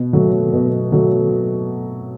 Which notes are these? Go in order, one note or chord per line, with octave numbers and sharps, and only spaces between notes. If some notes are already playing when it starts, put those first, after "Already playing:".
Already playing: B2
F#3 A3
B2
F#3 A3